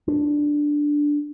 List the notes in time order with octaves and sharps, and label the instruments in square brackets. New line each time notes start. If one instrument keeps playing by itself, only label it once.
[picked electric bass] D4